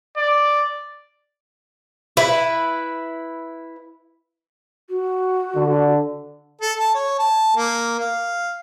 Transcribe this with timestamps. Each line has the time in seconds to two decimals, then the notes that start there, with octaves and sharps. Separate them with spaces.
0.17 D5
2.17 E4 B4
4.89 F#4
5.56 D3
6.61 A4
6.79 A5
6.95 C#5
7.19 A5
7.56 A#3
8.00 F5